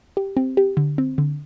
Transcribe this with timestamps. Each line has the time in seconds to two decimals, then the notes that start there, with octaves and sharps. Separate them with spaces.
0.17 G4
0.37 C4
0.57 G4
0.77 D3
0.98 C4
1.18 D3